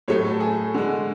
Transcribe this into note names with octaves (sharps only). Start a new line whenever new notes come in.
A2 F#3 A3 C#5
A4
G#4
D3 G#3